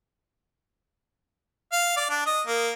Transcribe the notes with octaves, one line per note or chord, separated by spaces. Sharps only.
F5
D5
D4
D#5
A#3